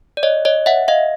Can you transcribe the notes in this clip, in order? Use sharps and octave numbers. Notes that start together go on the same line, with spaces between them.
D5
C#5 D#5
C#5 D#5
E5 F#5
D#5 F5